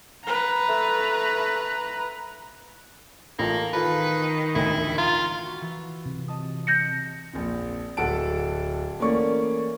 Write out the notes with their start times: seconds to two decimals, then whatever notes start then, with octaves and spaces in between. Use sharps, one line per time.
0.24 B4 A#5
0.69 A3
3.39 A1 A#3 F4 A4
3.73 D#3 F4 A4 B4
4.55 E1 A1 D2 E4
4.98 F4 A#5
5.41 F4 F#4
5.61 E3
6.06 C3
6.28 D#5 A5 D#6
6.67 G6 A#6 C#7
7.33 A#1 F2
7.97 D1 A4 F#5 A5 D7
8.99 E3 A3 A#3 C#4 D5 C#6